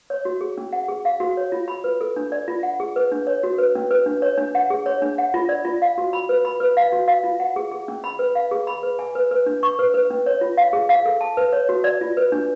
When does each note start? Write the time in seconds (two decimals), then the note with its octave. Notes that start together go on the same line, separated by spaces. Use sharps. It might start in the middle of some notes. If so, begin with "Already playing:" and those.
0.10 C#5
0.25 F#4
0.41 G#4
0.58 C#4
0.73 F#5
0.88 G#4
1.05 F5
1.20 F#4
1.37 C#5
1.52 F4
1.68 B5
1.84 B4
2.01 A4
2.16 D4
2.32 D5
2.48 F4
2.63 F#5
2.80 G#4
2.96 B4
3.12 D4
3.27 C#5
3.43 F#4
3.58 B4
3.75 C#4
3.91 B4
4.06 D4
4.22 C#5
4.38 D4
4.55 F#5
4.70 G#4
4.86 C#5
5.02 D4
5.18 F#5
5.34 F4
5.49 D5
5.65 F4
5.82 F5
5.98 F#4
6.13 B5
6.29 B4
6.45 B5
6.60 B4
6.77 F5
6.92 F#4
7.08 F5
7.24 F4
7.40 F#5
7.56 G#4
7.71 G#4
7.88 C#4
8.04 B5
8.19 B4
8.35 F5
8.51 G#4
8.67 B5
8.83 B4
8.99 G#5
9.15 B4
9.31 B4
9.46 D4
9.63 C#6
9.79 B4
9.94 B4
10.10 C#4
10.26 C#5
10.41 F4
10.57 F5
10.73 G#4
10.89 F5
11.06 A4
11.21 A5
11.37 B4
11.53 C#5
11.69 F#4
11.84 D5
12.01 F4
12.17 B4
12.32 D4